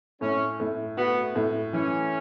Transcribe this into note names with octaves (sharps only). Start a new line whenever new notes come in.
A2 C#4
A2
B3 F#4
A2
E3 C#4